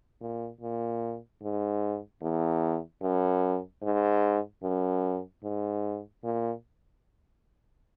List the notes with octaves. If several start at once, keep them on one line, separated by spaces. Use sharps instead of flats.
A#2
A#2
G#2
E2
F#2
G#2
F#2
G#2
A#2